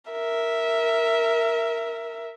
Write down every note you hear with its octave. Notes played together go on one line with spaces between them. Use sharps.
A#4 E5